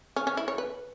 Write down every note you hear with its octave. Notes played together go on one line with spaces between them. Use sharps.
C#4
C#4
E4
C#5
B4